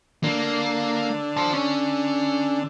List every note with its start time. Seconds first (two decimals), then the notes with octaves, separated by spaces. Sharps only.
0.23 D3 A#3
1.37 C5 A5
1.54 C#4